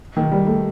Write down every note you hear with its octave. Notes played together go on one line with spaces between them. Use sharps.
D#3
G3
A3